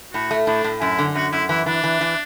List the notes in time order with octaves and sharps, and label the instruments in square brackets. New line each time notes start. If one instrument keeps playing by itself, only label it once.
[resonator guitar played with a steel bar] A2 [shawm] F#4
[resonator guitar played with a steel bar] A3
[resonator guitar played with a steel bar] A2 [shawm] D4
[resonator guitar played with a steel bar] A2
[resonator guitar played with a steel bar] F#2 [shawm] E4
[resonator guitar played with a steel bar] D3
[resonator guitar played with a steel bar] F#2 [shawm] F#4
[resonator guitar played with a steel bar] F#2 [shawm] E4
[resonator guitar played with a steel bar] E3 [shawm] E4
[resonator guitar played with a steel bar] E3 [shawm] D4
[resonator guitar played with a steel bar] E3
E3